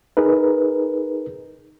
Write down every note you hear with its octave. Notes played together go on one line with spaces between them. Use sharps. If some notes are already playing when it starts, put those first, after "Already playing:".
D#4 G#4 A#4 B4